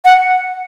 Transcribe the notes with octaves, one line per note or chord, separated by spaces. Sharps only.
F#5